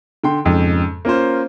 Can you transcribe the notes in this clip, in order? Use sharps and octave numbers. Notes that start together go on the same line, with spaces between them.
D3 G5 C6
F2 G#2 C#3
A#3 C#4 F4 C5